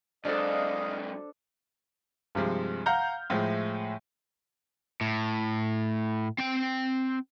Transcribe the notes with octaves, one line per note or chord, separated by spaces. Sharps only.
G#2 F#3 D4 A4 C5 D5 D#5 F5
G2 C3 F3 G#3
F5 F#5 A#5 F6 G6
A2 F3 G#3 E4
A2
C4 G5